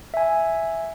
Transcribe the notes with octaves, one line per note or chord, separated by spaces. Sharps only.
E5 G#5